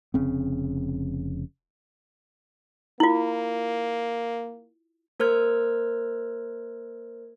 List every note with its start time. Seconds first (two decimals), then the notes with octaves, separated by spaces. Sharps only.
0.14 F1 C#3 C4
3.00 A#3 E4 F4
5.20 A#3 A#4 C5 F6 G#6